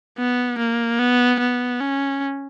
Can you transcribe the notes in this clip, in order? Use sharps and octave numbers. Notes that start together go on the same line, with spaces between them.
B3
A#3
B3
B3
C#4